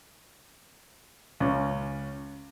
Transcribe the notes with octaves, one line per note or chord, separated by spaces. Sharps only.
C#2 C#4